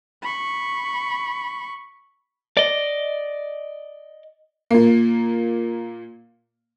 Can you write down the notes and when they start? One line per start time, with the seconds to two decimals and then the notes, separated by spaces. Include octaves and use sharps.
0.23 B5 C#6
2.57 D5 D#5
4.71 A#2 A#3